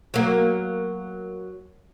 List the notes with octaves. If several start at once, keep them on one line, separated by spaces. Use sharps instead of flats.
F#3 A#3